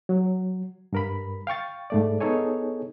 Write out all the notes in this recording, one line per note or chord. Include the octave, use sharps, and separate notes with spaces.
F#3
G2 A#4 B5
F5 G5 C#6 A6
G#2 A3 D5
B3 D#4 G#4 A4 C#5 G#5